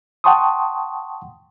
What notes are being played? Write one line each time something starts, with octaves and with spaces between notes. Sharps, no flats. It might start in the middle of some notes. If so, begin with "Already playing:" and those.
F#5 G5 A5 C6 C#6 D#6